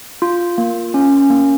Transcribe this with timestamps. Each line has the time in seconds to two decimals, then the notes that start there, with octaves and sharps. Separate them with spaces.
0.22 F4
0.58 A#3
0.94 C#4
1.30 A#3